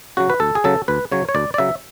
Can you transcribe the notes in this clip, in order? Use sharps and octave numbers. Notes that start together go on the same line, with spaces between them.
C#3 F#3 F#4
B4
D2 A4
G#4
C#3 F#3 A4
D2 B4
C#3 F#3 C#5
C#5
D2 D5
D5
C#3 F#3 E5